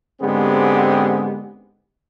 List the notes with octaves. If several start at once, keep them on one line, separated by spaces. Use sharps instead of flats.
G#2 D3 G#3 B3 C4 G4